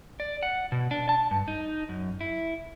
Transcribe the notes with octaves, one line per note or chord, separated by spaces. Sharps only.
D5
F#5
B2
D4
A5
G2
D#4
F#2
E4